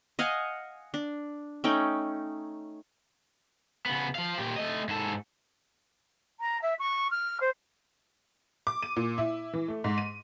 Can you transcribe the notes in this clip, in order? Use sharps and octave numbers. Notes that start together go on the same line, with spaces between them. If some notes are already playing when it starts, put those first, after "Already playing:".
D#5 F5 F#5 G#5
D4
A3 C#4 D#4 G5
C#3 B3
F3 F5
A#2 G4
A3 D#5
G#2 A4
A#5
E5
C#6
F6
C5
D6
D#7
A#2
E4
E3
A3
G#2
D#7